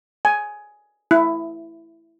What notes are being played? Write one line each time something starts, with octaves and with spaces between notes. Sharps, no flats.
G#5
E4